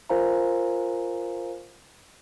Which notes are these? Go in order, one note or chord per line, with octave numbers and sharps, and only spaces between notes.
F4 A#4 C5 F5 G#5 A#5